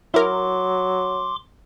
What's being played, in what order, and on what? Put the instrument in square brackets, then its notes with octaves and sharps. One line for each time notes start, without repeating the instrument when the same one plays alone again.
[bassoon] F#3 [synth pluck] E4 A#4 [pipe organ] C6 D6